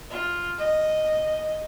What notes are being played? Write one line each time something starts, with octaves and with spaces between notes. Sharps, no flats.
F4
D#5